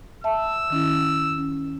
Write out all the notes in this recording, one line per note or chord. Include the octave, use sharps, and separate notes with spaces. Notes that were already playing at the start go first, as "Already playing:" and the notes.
E5 A5 E6
D#3 C#4 E4
C#4